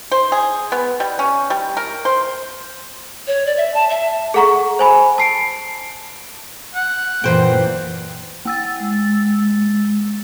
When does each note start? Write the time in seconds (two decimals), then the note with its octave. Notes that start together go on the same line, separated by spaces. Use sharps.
0.12 C5
0.32 G#4
0.72 B3
1.00 G3
1.19 C#4
1.50 G3
1.77 A#4
2.05 C5
3.27 C#5
3.46 D5
3.57 E5
3.74 A5
3.90 E5
4.34 G#4 A4 F#5 A#5 C#6
4.79 C5 G#5 B5
5.18 A5 C7 D7
6.75 F#5
7.24 F#2 A#2 E3 B4 C5 G5
8.45 A#3 F#5 E6 A6
8.80 G#3